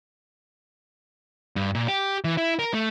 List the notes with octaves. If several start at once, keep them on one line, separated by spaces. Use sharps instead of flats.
G2
A#2
G4
E3
E4
A#4
A3